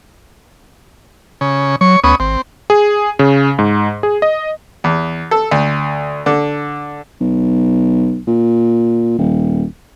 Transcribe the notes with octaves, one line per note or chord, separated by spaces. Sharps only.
C#3
F#3 C#5
D2 B3 C#4 D#6
G#1 C4
G#4
C#3
G#2
G#4
D#5
E2
A4
D2
D3
B1
A#2
D#1